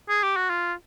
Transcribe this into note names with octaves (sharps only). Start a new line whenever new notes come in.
G#4
G4
F#4
F4